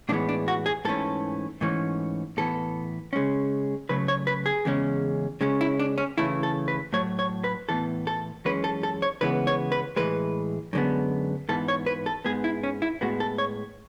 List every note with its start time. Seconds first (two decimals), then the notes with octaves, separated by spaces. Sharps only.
0.09 A2 E3 G#3 B3 D4
0.29 D4
0.48 F#4
0.66 G#4
0.85 G#2 E3 A3 C#4 A4
1.61 G#2 E3 A3 C#4
2.37 A2 E3 B3 A4
3.13 C#3 G#3 C#4
3.89 C#3 F#3 A3 B4
4.08 C#5
4.27 B4
4.46 G#4
4.65 E2 C#3 G#3 C#4
5.41 C#3 G#3 C#4
5.61 E4
5.79 D4
5.98 C#4
6.18 C#3 E3 A3 E4
6.43 A4
6.68 B4
6.93 A2 F#3 A3 C#5
7.19 C#5
7.44 B4
7.69 A2 E3 B3 A4
8.07 A4
8.45 F#2 E3 G#3 C#4 B4
8.64 A4
8.83 A4
9.02 C#5
9.21 C#3 E3 G#3 B3 B4
9.47 C#5
9.72 B4
9.96 A2 E3 G#3 B4
10.73 F#2 D3 G#3 B3
11.49 G#2 E3 B3 A4
11.68 C#5
11.86 B4
12.06 A4
12.25 G#2 G#3 B3 G#4
12.44 E4
12.63 C#4
12.82 E4
13.01 A2 G#3 B3 F#4
13.20 A4
13.38 C#5